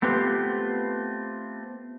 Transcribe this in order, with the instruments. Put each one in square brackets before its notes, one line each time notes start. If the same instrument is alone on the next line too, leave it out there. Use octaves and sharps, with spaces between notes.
[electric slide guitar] A3 B3 C4 F4 G4 B4